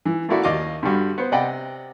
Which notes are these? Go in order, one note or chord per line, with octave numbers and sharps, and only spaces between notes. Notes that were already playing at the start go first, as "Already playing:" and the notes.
E3
A3 A#3 E4 F#4 D5
D#2 D5 D#5 F5 D6
G2 D3 G3 F#4
B3 C5
C3 D5 D#5 F#5 G5 B5